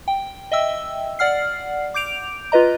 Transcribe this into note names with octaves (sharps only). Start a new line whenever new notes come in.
G5
D#5 E5 G5 E6
D5 F#5 F6 C7
D6 G6 D7 F7
F4 B4 D#5 A#5